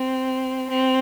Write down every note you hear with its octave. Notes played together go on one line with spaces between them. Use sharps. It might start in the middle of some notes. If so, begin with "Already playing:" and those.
Already playing: C4
C4